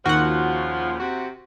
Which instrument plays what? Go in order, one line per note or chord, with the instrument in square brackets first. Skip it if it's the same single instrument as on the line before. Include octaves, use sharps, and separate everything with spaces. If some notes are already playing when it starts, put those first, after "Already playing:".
[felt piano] D#2 [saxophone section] A#2 C#3 F3 [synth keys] F#4 F#5
[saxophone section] C3 F#4